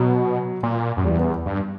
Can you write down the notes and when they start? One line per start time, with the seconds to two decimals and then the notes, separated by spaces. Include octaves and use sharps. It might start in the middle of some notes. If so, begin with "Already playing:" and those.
Already playing: B2 F#3
0.63 A#2
0.97 F#2
1.05 E2 G3
1.19 B3
1.46 G2